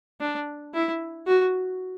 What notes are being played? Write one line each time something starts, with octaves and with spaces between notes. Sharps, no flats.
D4
E4
F#4